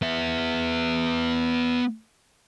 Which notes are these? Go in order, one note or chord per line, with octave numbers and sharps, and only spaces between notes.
B3 E5